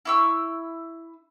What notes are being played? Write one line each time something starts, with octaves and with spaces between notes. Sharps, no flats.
E4 C#6 E6